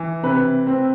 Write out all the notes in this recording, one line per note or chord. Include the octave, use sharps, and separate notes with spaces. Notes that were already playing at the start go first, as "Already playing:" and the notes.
Already playing: E3
C3 B4
C4